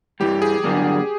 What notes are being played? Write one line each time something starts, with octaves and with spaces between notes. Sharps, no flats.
G2 E3 G3 G4
G#4
G2 D3 F#3 A#3 D4